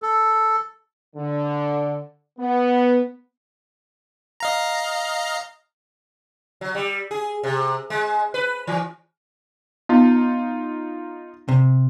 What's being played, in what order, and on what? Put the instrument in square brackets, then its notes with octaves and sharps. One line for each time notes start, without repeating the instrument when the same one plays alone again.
[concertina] A4
[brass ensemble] D3
B3
[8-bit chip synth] D#5 F5 A#5
[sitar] F#3
G3
G#4
C3
G#3
B4
E3
[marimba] B3 [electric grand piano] D#4 F4
[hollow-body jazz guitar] C3